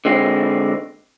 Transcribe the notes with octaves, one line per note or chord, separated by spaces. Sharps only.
D3 G#3 C4